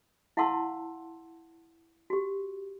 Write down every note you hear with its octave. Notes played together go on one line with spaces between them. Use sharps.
E4 F5 F#5 A5 C6 E6
F#4 G4